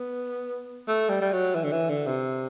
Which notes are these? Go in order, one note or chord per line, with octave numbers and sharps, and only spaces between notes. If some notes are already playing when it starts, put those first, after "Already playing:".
Already playing: B3
A3
G3
G3
F#3
E3
D3
E3
D3
C3